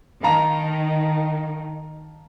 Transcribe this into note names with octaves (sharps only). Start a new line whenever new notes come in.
D#3 F5 A5 A#5